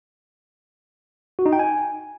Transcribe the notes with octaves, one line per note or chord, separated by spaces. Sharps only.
F#4
D#4
G5
G#5